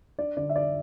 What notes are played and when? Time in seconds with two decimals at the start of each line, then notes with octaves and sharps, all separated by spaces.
0.19 D4 D5
0.37 D3 D5
0.49 E5
0.55 D4 D5